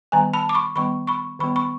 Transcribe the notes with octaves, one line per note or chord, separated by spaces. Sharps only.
D#3 G3 B3 G#5 A#5
A5 B5
D6
B5 C#6
D#3 G3 B3 B5 C#6
B5 C#6
D#3 G3 B3 B5 C#6
B5 C#6